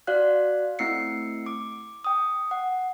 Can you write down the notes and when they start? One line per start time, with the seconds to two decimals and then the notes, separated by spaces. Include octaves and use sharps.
0.07 F#4 D5 F5 F#6
0.79 A3 C4 E4 E6 C7 C#7
1.46 D6
2.05 G5 D#6
2.51 F#5